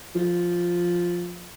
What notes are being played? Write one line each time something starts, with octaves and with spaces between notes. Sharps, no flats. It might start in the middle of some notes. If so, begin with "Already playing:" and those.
F3